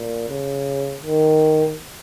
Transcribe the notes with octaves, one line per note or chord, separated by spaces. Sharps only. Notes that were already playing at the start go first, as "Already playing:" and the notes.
Already playing: A#2
C#3
D#3